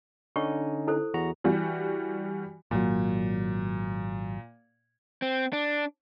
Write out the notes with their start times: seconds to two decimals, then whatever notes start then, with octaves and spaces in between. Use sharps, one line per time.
0.36 D3 C#4 D#4 C#6
0.87 E4 A4 C5
1.14 E2 F#4 A#5
1.44 E3 G3 F#4
2.71 G#1 A#2 F#3
5.22 C4
5.53 D4